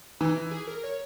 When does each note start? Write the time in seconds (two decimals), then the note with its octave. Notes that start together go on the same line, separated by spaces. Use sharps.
0.21 E3 D#4
0.51 G#4
0.67 A#4
0.84 C#5